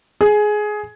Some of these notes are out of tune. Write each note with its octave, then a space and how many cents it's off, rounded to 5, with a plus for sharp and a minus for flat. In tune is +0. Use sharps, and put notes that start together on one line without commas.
G#4 +15